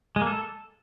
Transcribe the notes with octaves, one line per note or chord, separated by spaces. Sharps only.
G#3
A#3
A4